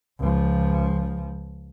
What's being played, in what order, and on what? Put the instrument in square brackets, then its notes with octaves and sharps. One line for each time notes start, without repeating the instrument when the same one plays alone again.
[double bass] C#2 F3